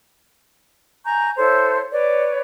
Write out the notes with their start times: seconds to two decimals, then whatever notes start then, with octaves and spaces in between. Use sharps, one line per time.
1.05 G#5 A#5 C#6 G6
1.37 E4 A4 C5 C#5
1.92 B4 C#5 D5